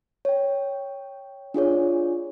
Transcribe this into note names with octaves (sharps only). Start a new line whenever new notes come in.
C#5 G5
D4 F4 G#4 C#5